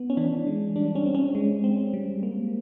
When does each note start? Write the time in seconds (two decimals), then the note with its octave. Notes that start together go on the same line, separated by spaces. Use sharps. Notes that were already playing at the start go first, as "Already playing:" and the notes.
Already playing: B3
0.10 C#4
0.17 E3 D4
0.47 G#3
0.76 G3 D4
0.95 C#4
1.06 C4
1.15 C#4
1.35 G#3
1.64 C4
1.94 G3
2.23 A#3